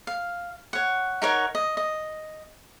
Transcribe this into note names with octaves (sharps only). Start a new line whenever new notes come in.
F5
C#5 F#5
D#4 A#4 C#5 F#5
D#5
D#5